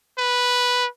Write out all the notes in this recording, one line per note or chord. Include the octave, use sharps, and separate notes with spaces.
B4